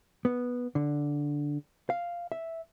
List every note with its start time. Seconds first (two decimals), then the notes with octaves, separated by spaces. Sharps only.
0.25 B3
0.75 D3
1.90 F5
2.32 E5